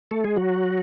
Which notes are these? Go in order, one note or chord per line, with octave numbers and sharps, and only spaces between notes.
A3 A4
G#3 G#4
F#3 F#4